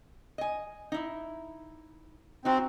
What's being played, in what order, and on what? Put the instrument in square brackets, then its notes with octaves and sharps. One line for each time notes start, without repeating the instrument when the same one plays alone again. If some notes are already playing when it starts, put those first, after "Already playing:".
[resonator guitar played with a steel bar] D#5 G#5
D#4 E4
[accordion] C4 [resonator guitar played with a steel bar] D#4 F#4